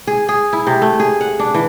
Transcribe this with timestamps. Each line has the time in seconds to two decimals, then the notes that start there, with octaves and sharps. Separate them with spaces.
0.07 G#4
0.29 G#4
0.53 E4
0.67 C3
0.82 A3
1.00 G#4
1.21 F#5
1.39 D4
1.54 E3